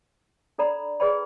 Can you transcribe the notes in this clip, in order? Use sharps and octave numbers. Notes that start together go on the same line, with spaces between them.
D4 A4 D5 A#5 B5
G#4 B4 D5 G5 B5